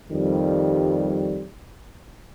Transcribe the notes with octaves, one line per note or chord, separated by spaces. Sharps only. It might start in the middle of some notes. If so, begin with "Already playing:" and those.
F2 D#3 G3